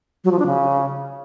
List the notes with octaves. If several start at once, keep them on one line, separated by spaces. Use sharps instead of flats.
F#3
F3
D4
C#3